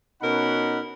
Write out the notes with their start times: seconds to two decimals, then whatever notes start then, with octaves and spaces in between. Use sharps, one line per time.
0.22 B2 C#4 D#4 A#4 F#5 B5